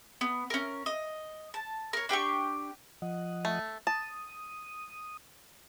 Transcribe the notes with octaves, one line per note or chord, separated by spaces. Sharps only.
B3
C#4 A#4
D#5
A5
A#4 C#5
D4 G4 G5 C#6
F3 D#5 F#5
A3
A5 D#6